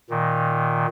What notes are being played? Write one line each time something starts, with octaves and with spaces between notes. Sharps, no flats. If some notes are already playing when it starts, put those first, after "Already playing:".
A#2 D#3